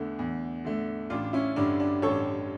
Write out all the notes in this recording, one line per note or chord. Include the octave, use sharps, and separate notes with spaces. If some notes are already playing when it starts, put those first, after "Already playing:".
Already playing: E2 D3 A3
E2
D3 A3
A1 D4 F4
C#4 E4
G2 D3 D4
D4
A1 A4 C#5